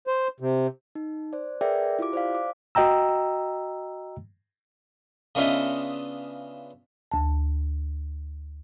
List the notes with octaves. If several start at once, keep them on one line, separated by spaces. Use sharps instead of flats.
C5
C3
D#4
C5 D5
G#4 A#4 B4 D5 E5 G5
E4 F4 G4 D6
C5 D5 F5
D6
F#4 D#5 G5 A#5 E6
C#3 B3 D4 F4 D#5 E5
D2 A5